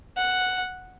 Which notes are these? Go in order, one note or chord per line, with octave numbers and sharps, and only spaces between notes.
F#5